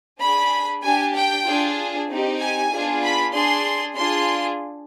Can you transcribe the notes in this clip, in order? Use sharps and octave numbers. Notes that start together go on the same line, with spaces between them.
D4 G#4 B5
D4 G4 G#5
G5
D4 F4 G#4
C4 D#4 G4
G#5
B3 D4 F4 G#4
B5
D4 G#4 C6
D4 F4 G#4 C6